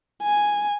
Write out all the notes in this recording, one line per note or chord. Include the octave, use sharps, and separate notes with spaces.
G#5